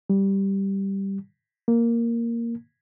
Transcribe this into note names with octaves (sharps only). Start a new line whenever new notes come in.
G3
A#3